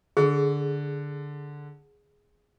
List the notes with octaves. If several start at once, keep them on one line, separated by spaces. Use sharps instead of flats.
D3 G#4